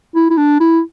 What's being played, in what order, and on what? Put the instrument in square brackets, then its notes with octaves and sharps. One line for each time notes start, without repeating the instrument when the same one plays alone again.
[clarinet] E4
E4
D4
E4